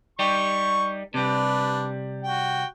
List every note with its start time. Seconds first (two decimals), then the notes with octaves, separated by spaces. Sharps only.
0.19 G3 D#4 G4 C#6
1.14 C3 G3 D4 B4
2.23 F#4 G5